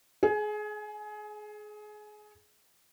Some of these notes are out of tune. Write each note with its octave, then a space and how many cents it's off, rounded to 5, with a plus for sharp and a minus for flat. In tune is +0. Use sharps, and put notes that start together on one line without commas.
G#4 +25 G#5 -10